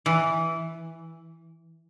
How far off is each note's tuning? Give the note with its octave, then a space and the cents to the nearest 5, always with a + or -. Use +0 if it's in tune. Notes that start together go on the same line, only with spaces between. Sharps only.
E3 -5